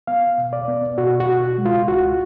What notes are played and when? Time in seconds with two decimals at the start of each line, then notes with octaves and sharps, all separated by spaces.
0.07 B3 F5
0.38 B2
0.53 D5
0.68 B3
0.98 B2 F#4
1.20 F#4
1.28 B2
1.58 G#3
1.66 F4
1.88 C#2 F#4